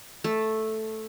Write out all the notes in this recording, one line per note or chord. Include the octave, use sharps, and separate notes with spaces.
A3